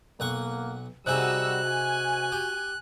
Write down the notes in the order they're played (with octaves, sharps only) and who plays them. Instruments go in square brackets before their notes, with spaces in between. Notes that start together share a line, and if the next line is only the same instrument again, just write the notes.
[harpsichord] B1 F#5 C#6 [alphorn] A#3
[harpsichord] C3 D#4 G#4 [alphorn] G3 [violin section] F#4 E6 [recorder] F#6
[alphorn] F#4 [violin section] G#5
[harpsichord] G4